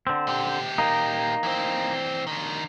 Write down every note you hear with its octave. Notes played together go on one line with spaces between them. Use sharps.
D3 C4
A#2 G4
A#3 D#4
E3 C4
D3 D#3